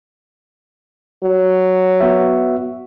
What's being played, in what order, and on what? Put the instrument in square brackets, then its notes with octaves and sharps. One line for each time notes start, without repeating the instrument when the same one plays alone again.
[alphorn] F#3
[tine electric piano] B3 F#4 E5